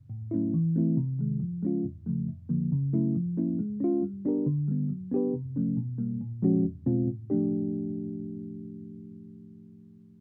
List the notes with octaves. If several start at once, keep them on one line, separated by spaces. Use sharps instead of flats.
A2
F#3 A3 C#4 E4
E3
A3 C4 E4
C3
D#3 G#3
F3
G#3 C#4 F4
E2
C#3 F3 A3
F2
D3 F3 A#3
C#3
F#3 A3 C#4 E4
F3
A#3 C#4 E4
G#3
C#4 F4
G3
B3 D4 G4 A#4
D3
G3 B3
F#3
B3 D4 G4 B4
C3
F3 A3 C#4
B2
G3 A#3
A#2
F3 G#3 C#4 F#4
E2
B2 G#3 C4 F4
A2
F3 A3 D4 G4